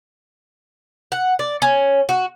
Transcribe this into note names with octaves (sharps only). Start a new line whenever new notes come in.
F#5
D5
C#4
F#4